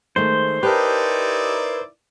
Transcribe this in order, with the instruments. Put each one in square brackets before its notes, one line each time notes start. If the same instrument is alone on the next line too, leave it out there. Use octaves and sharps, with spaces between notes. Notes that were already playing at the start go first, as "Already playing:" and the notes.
[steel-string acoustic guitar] D#3 G#3 A3 [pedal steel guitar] C5
[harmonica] D#4 E4 D5 [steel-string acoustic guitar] G4 A5 [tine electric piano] A#4 B4